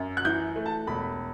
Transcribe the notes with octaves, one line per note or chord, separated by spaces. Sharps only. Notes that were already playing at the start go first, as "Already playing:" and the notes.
Already playing: F#2
F#6
E3 G6
A3
A5
E1 B5